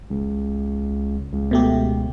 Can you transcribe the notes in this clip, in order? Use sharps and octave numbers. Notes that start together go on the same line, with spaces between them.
C#2
C#2
B2 A3 G4